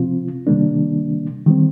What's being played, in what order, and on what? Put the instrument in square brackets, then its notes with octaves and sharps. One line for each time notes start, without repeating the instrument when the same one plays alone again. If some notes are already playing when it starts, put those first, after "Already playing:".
Already playing: [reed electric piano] C3 F3 C4 F4
C3 D#3 G3 A#3 D4
D#3 G3 C4